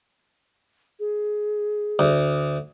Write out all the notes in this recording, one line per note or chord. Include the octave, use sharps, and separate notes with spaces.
G#4
D2